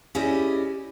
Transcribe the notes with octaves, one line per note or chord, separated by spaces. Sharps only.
C#4 E4 G4 G#4 D5 D#5